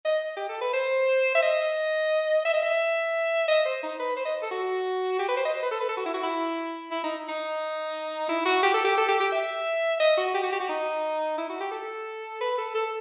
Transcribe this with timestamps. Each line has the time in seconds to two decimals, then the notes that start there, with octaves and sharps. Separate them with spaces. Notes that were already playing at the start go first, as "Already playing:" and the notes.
0.05 D#5
0.37 G4
0.49 A4
0.61 B4
0.73 C5
1.35 E5
1.42 D#5
2.45 E5
2.54 D#5
2.63 E5
3.48 D#5
3.65 C5
3.83 D#4
4.00 B4
4.16 C5
4.25 D#5
4.42 A4
4.51 F#4
5.19 G4
5.28 B4
5.37 C5
5.45 D#5
5.54 C5
5.62 B4
5.71 A4
5.80 B4
5.89 A4
5.97 F#4
6.05 E4
6.14 F#4
6.23 E4
6.91 E4
7.04 D#4
7.29 D#4
8.29 E4
8.45 F#4
8.63 G4
8.74 A4
8.85 G4
8.97 A4
9.08 G4
9.20 G4
9.32 E5
10.00 D#5
10.17 F#4
10.34 G4
10.43 F#4
10.52 G4
10.60 F#4
10.69 D#4
11.38 E4
11.49 F#4
11.60 G4
11.72 A4
12.41 B4
12.58 A4
12.75 A4